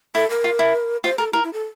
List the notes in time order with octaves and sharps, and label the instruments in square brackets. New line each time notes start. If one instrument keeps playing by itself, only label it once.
[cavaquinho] E4 [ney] A4
[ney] A#4
[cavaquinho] F4
E4
[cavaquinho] F4 [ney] C5
[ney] A4 [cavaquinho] A#4
[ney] E4 [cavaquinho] A#4
[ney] E4
A4